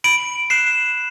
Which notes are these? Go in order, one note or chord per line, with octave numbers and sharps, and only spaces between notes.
B5 D7 F#7
F#6 C7 E7